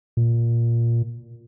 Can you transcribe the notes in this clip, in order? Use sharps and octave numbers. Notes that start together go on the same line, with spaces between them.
A#2